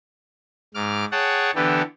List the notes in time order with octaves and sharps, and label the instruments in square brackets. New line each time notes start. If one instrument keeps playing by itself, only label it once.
[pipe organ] G#2 D6 F6
G#4 C#5 F#5 G5 A5
D3 E3 B3 G4 A4